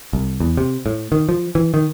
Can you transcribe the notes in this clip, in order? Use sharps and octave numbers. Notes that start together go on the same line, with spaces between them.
C2
E2
C3
A2
D#3
F3
E3
D#3